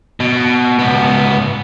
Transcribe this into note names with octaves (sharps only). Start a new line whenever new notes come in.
B2
C#2 B3